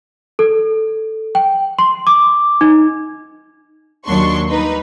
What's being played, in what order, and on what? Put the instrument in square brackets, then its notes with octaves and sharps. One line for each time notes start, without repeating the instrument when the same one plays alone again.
[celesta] A4
G5
C6
D6
D#4
[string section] D#2 F#3 D4 C6 C#6
G3 D#4 B4